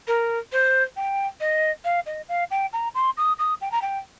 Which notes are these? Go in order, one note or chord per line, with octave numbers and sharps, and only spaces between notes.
A#4
C5
G5
D#5
F5
D#5
F5
G5
A#5
C6
D#6
D#6
G5
A#5
G5